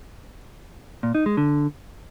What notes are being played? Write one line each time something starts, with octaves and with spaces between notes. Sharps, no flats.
A#2
D#4
G#3
D3